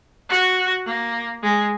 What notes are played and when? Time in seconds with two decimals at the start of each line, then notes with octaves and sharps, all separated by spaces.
0.29 F#4
0.86 A#3
1.43 G#3